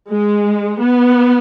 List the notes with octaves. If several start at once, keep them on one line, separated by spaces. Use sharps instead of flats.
G#3
B3